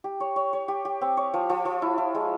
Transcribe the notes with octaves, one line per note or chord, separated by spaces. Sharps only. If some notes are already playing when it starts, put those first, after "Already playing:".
G4
C#5
C#5
C#5
G4
G4
C4
C#5
F3
F3
F3
E4
E4
G#3